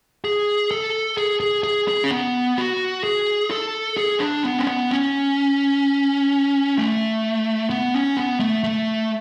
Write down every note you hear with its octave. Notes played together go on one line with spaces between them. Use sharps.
G#4
A4
G#4
G#4
G#4
G#4
C#4
B3
F#4
G#4
A4
G#4
D4
B3
C#4
B3
C#4
A3
B3
C#4
B3
A3
A3